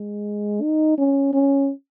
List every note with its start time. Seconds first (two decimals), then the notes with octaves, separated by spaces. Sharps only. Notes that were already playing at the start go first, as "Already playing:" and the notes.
Already playing: G#3
0.62 D#4
0.98 C#4
1.33 C#4